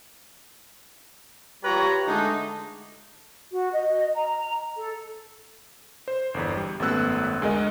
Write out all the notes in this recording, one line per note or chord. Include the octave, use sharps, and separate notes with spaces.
G3 F4 G4 B4 C#5 A#5
D3 G#3 A3 D#4
F#4
D#5
A#5
A4
C5
G1 E2
G3
G#1 F#2 A3 B3 E6 F#6
D2 G#3 A#4 D#5